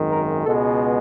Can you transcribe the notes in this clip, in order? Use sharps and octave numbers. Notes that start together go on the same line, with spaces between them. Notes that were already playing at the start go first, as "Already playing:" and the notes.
Already playing: G#1 F#2 D#3 G#3
A#4
C#2 B2 G#3 B3 A4